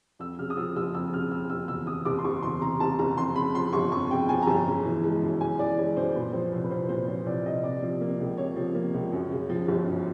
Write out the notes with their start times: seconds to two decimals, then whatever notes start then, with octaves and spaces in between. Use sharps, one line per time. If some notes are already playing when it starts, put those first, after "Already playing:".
0.19 F2 E6
0.39 C#3 F6
0.50 D#6
0.57 F3 E6
0.76 F#1 E6
0.94 F2 E6
1.13 C#3 F6
1.31 F3 E6
1.50 F#1 E6
1.68 E2 E6
1.87 C3 D#6
2.05 F#1 D6
2.19 C6
2.25 F#1 C#6
2.43 E2 C6
2.61 C3 A#5
2.80 F#1 A5
2.99 F#1 A#5
3.17 F2 C6
3.36 C#3 B5
3.54 F3 C6
3.73 G1 C#6
3.92 F2 C#6
4.11 C#3 G5
4.29 F3 G#5
4.42 A#5
4.47 G1 A5
4.66 C#3
4.85 E3
5.04 G#3
5.22 F#2
5.40 C#3 G#5
5.59 E3 D5
5.78 G#3 C#5
5.96 F#2 C5
6.15 A#2 B4
6.33 F3 C5
6.52 C2
6.64 B4
6.71 C2 C5
6.89 A#2 C5
7.08 F3 C#5
7.26 C2 D5
7.46 C2 D#5
7.63 C3 D5
7.83 F3
8.01 A#3
8.20 C#2
8.38 C3 C#5
8.56 F3
8.75 A#3
8.94 C#2
9.13 F#2
9.31 C#3
9.49 F3
9.68 G1
9.87 F#2